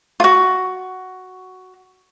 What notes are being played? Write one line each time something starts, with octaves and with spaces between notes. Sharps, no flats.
F4 F#4